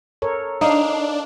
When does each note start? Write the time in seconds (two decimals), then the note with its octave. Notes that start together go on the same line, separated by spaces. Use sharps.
0.22 A4 A#4 C#5
0.61 D4 D#4 F5